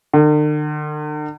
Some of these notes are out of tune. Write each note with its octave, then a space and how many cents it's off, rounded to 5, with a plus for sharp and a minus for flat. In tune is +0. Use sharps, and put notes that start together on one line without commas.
D3 +45